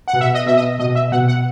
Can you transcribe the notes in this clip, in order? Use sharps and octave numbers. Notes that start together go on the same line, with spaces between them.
F#5
B2
E5
D#5
B2 E5
D#5
B2 D#5
E5
B2 F#5
F#5